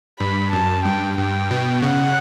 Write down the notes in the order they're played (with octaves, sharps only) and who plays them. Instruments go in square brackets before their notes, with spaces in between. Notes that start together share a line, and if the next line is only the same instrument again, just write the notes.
[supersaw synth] G2 [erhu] B5
[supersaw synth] F#2 [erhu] A5
[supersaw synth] G2 [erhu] G5
[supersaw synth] G2 [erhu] G5
[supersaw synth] B2
[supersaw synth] C#3 [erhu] F#5